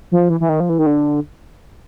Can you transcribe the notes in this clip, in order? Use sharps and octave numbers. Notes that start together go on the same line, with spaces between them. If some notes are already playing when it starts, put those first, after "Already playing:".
F3
E3
E3
D#3
F3
E3
D#3
D3